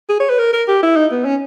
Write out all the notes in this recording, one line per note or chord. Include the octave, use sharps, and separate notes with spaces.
G#4
C#5
B4
A#4
A#4
G4
E4
D#4
B3
C#4